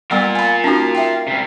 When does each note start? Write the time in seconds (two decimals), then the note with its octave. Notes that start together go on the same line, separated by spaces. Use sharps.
0.11 G3 B3 F4 A#4 F#5
0.35 G#5 B5
0.64 C#4 D#4 F#4
0.95 E5 G5
1.28 C3 G3